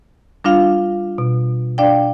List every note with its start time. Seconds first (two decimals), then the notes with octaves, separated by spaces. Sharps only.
0.44 G3 D4 F4 F5
1.18 B2
1.78 D4 D5 F5 G5